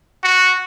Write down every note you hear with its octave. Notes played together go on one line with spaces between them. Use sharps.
F#4